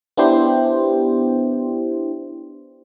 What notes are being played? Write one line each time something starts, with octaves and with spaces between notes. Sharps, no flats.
B3 D4 E4 G4 C5